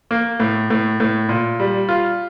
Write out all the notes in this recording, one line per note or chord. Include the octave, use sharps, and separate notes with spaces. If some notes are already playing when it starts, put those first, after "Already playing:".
A#3
A2
A2
A2
A#2
G3
F4